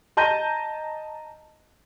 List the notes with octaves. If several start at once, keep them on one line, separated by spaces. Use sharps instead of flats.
D#5 A5 A#5 G6 A#6 D#7